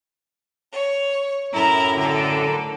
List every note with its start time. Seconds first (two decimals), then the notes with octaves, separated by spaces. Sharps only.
0.71 C#5
1.53 F#2 A2 E4 A#4 A#5
1.96 D3 A4